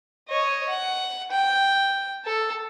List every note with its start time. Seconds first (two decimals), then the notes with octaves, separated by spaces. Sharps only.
0.29 C#5 D#5
0.69 F#5
1.31 G5
2.25 A4